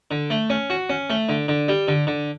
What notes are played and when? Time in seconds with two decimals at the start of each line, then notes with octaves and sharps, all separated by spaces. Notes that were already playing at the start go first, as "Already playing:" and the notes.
0.11 D3
0.30 A3
0.50 C#4
0.70 F#4
0.90 C#4
1.10 A3
1.29 D3
1.48 D3
1.68 G3
1.88 D3
2.07 D3